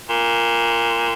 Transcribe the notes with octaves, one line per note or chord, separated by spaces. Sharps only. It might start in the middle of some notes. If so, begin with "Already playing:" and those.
A#2